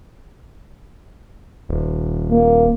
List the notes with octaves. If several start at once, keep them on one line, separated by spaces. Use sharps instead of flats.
D#1
A#3